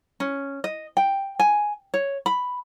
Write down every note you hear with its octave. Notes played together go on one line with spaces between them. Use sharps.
C#4
D#5
G5
G#5
C#5
B5